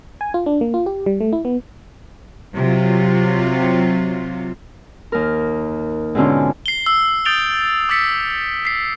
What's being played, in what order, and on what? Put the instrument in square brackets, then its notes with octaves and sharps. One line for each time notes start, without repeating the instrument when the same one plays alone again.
[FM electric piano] G#5
F4
D4
A#3
F4
G4
G3
A3
E4
B3
[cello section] C3 F#3 F4
[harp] D#2 A#4
G#2 B2 D3 C#4 F4
[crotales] C7 G7
E6
D#6 G6 A6 D7 F7 G7
D6 E6 A6 B6 C#7
B6 C7